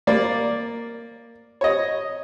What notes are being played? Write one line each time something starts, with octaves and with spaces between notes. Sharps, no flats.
A#3 D5
C#5 D#5